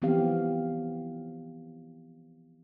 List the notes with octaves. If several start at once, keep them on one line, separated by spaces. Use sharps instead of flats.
E3 F3 B3 C4 G4 F5